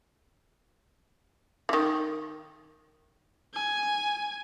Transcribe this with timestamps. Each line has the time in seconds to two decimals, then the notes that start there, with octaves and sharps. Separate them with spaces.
1.69 D#3 E3
3.54 G#5